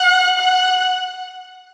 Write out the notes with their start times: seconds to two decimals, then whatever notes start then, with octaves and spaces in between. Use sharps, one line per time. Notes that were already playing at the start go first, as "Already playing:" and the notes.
Already playing: F#5
0.38 F#5